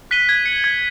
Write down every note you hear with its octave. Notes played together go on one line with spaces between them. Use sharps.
F#6 B6 D#7 G7
G#6
C#7 F#7
G#6